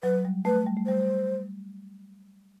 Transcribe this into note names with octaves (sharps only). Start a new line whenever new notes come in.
F#3 B4
G3
A3 B4
G3
A3
G3 C5